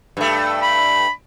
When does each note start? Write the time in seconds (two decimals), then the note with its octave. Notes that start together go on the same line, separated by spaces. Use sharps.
0.17 G2 A3
0.62 B5